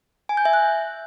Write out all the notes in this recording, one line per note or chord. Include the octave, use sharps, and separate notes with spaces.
G#5
G6
E5
F#6